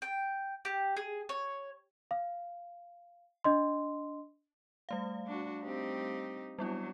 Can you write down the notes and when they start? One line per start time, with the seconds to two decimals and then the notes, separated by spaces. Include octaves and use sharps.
0.02 G5
0.65 G4
0.97 G#4
1.29 C#5
2.11 F5
3.44 D4 D#5 C6
4.89 G3 A3 F5
5.27 D4 F#4
5.63 C4 D#4 G4
6.59 F#3 G3 B3 D4 E4